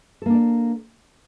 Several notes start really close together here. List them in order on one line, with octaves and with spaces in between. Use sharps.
A4 A#3 D4 D5